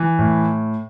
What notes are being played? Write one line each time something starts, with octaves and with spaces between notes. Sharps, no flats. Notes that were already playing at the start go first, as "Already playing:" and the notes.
Already playing: E3
A2